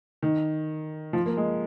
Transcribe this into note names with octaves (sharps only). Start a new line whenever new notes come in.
D#3
F3
A#3
G#3